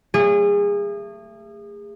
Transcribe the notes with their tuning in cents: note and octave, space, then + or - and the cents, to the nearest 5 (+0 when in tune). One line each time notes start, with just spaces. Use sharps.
A3 +30 G#4 -30